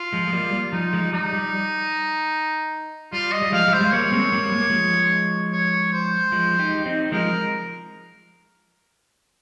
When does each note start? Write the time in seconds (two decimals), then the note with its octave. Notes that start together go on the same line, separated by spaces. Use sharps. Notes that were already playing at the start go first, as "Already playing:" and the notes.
Already playing: F4
0.13 F3 G#3
0.27 G#3
0.32 G3 A#3
0.53 G3
0.73 F3 D#4
0.93 F3 G#3
1.13 G3 D#4
1.33 G3
3.13 G3 F4
3.32 D#5
3.42 G3
3.52 F3 G#3 F5
3.68 G3
3.73 C5
3.81 G#3
3.92 G3 A#3 C#5
4.12 G#3 C4
4.32 G3 A#3
4.52 G#3
4.61 A#3
4.70 F3 G#3
5.53 C#5
5.93 C5
6.32 F3 G#3
6.59 D#4 G4
6.86 C4 D#4
7.12 F3 G#3 A#4